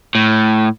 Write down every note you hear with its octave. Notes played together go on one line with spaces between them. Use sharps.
A2